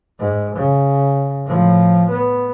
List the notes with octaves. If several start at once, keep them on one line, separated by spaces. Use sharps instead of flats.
G#2
C#3
A2 F3
B3